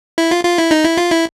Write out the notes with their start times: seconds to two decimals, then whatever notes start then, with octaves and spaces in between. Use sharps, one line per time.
0.18 E4
0.31 F4
0.45 F4
0.58 E4
0.71 D#4
0.84 E4
0.97 F4
1.11 E4